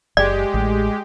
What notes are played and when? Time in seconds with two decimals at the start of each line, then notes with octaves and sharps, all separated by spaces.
0.17 F#1 G#3 G4 D5
0.54 A1